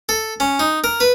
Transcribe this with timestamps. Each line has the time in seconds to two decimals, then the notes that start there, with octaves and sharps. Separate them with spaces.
0.09 A4
0.40 C#4
0.59 D#4
0.84 A#4
1.00 B4